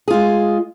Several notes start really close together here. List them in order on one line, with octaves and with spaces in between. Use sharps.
G#4 F4 G#3